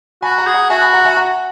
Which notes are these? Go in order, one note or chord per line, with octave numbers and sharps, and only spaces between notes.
F#4 G#5 B5
F#5 A#5
G#4
F#5 A#5
F#4 E5 G#5
G#5 B5
F#5 A#5
E5 G#5
F#5 A#5